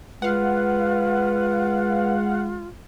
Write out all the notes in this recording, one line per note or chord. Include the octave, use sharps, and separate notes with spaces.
G#3 F4 B4 F5 F#5